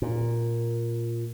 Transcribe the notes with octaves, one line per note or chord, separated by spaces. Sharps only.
A#2